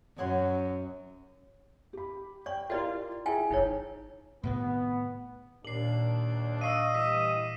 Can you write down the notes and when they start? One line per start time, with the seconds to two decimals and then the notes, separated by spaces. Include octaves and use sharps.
0.18 F#2 C#5 F#5 C6
1.93 G4 B5
2.46 D5 G5 C#6
2.70 E4 F4 G4 A#4 D5 D#5
3.26 E4 G#4 E5 G5 G#5
3.51 G1 D#4 E4 C#5
4.43 A2 C3 D#3 B3
5.65 D#2 A#2 D4 C7 F#7
6.61 D#5 F5 C#6 E6 C7 D#7
6.94 E3 G3 D6 E6 B6